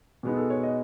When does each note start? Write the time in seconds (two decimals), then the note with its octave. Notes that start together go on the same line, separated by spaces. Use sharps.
0.23 B2 G#3 B3 D#4
0.37 A4
0.50 C#5
0.63 D#5